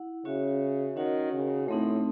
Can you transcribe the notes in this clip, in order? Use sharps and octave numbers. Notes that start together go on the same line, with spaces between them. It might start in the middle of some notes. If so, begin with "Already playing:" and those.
Already playing: E4 F#5
C#3 C#4 F#4 C#5 E5
D#3 C#4 F#4 C#5 F#5
C#3
A2 A3 C4 D#4